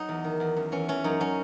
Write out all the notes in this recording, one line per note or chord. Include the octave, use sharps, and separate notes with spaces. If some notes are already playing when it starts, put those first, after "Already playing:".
Already playing: F#3 D#4
E2
D#3
E2
F#2
E3 C#4
E3 C#4
F#2 D#4
F#3 C#4